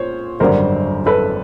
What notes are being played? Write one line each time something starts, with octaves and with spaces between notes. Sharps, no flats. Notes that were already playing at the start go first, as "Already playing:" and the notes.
Already playing: A#2 C5 C#5
G#1 F#2 D3 G3 A#4 C5
A4 B4